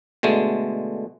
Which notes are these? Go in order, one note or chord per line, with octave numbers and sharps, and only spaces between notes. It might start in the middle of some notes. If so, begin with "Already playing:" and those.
B2 D3 G#3 A3